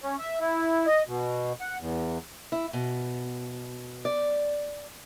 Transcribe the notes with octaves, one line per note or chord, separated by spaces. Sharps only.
C#4
E5
E4
D#5
B2
F#5
E2
E4
B2
D5